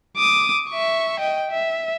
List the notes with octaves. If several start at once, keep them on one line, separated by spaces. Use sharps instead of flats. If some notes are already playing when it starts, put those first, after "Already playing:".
D6 D#6
E5 C#6
D#5 G5
E5